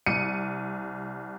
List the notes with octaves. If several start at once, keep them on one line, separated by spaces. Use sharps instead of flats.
C2 C#7 D#7